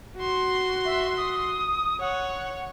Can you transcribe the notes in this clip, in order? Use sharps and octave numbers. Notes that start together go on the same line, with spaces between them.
F#4 C6
E5
D#6
C#5 F#5